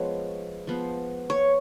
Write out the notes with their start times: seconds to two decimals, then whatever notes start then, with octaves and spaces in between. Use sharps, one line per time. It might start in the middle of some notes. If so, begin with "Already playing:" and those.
Already playing: F3 G#3 B3 C#5
0.67 F3 B3
1.30 C#5